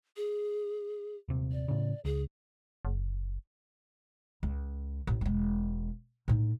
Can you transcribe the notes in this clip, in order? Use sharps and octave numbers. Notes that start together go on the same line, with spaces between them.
G#4
D#1 C3
D5
A2 C#3
C#2 G#4
F#1
C#2
A1
E1 G#3
A2 D#4